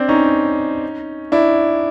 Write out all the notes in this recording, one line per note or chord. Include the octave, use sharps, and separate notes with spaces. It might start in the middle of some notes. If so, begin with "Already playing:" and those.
Already playing: C4 D4
C#4 D#4
D4 E4